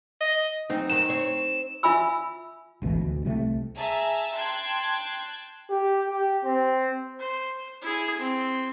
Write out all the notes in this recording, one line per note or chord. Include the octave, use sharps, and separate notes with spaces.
D#5
F#2 C4 D#4
F#2 D#3 C4 E7
C4 C#5
F4 E5 G#5 B5 E6
G#1 D2 B2 E3
D2
C2 C3 G#3 A3
G#4 E5 A5 A#5
G5 A5 C6 F#6 G#6
G4
G4
C4
C5
E4 G#4
C4